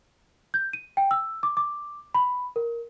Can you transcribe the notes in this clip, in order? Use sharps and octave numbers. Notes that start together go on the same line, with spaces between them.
G6
D#7
G5
E6
D6
D6
B5
A#4